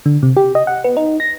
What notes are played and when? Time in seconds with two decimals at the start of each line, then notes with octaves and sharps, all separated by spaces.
0.06 D3
0.23 C3
0.37 G4
0.55 D#5
0.67 F#5
0.84 B3
0.97 D#4
1.20 A#6